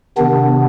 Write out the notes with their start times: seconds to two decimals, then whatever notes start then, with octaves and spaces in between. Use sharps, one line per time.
0.17 C3 D#3 B3 D4